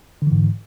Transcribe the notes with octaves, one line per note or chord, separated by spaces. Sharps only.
G#2 D3 E3